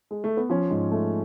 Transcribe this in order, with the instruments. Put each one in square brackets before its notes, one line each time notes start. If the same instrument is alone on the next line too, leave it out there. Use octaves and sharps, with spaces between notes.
[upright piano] G#3
A3
B3
[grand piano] F3 [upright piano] C#4
[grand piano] G#2
A3